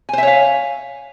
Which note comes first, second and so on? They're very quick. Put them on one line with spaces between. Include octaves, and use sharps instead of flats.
G#5 C5 E5 C#5 F5